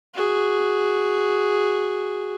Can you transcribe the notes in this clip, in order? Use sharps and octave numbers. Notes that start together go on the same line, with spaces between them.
F#4 G#4